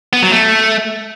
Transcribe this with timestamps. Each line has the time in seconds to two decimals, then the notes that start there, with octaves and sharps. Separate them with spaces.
0.13 B3
0.22 F#3
0.32 A3